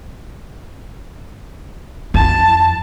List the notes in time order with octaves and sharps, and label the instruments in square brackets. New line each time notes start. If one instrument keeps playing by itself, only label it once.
[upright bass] F2 [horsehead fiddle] A5